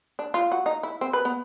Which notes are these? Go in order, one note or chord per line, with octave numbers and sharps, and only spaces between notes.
D4
F4
F#4
D#4
E4
C4
B4
B3